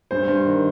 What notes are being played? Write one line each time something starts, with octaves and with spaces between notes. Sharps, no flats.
G2 C5
G2
D#3